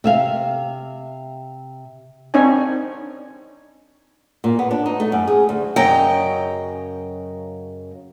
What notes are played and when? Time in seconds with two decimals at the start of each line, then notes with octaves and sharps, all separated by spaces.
0.04 C3 E5 F5
2.34 C4 D4 D#4 C#5 G#5
4.44 A#2
4.59 B3
4.71 D4
4.86 D#4
5.00 A3
5.12 F#2
5.27 G#4
5.49 D2
5.76 F#2 C#3 F#3 D#5 G5 A#5